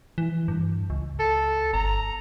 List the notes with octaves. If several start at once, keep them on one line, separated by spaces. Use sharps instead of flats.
E3
G2
C#2
A4
G1 A#5